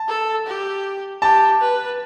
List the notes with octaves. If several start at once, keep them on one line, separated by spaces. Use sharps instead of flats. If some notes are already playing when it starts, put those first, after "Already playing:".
Already playing: A5
A4
G4
G4 A5
B4